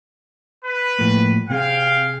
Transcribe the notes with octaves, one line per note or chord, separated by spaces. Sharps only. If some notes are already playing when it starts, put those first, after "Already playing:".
B4
A2 F3 A#3
C3 C4 G#4 F5 G5